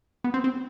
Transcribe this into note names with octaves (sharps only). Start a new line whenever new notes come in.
B3
C4
C4